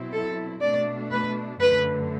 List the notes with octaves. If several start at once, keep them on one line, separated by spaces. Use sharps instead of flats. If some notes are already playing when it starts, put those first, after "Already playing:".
Already playing: B2 F#3 C4 E4
A4
B2 A3 D4 D5
B4
F#2 D3 A3 B4